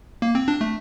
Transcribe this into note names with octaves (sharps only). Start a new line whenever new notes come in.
A#3
C4
D4
A3